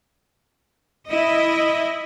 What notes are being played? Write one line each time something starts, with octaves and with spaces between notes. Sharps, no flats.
E4 D#5